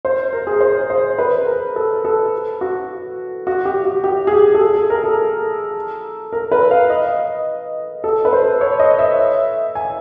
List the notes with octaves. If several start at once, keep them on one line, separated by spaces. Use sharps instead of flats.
C5
A#4
G#4
C5
C5
B4
A#4
A4
A4
F#4
F#4
G4
F#4
G4
G#4
G4
A4
G#4
A4
A#4
A4
A#4
B4
F5
D#5
A4
B4
C5
C#5
D#5
E5
G#5